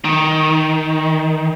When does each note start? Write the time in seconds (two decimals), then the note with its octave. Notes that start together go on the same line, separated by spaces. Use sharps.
0.05 D#3